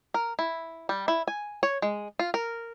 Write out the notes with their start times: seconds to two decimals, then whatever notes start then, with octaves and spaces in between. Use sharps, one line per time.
0.14 A#4
0.39 E4
0.89 G3
1.08 E4
1.28 G#5
1.63 C#5
1.82 G#3
2.19 F4
2.34 A#4